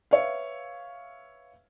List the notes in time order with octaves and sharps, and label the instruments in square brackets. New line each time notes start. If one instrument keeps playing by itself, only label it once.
[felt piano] B4 C#5 E5 F5